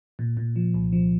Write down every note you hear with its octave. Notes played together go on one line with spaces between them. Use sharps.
A#2
A#2
F3
C2
F3